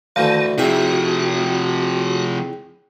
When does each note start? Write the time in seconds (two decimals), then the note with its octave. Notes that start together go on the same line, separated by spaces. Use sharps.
0.16 D2 D#3 E3 F5 A5
0.58 C3 F3 E4 F#4 G#4 E5 G5